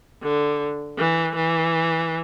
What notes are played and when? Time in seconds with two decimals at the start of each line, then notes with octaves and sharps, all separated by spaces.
0.23 D3
0.98 E3
1.36 E3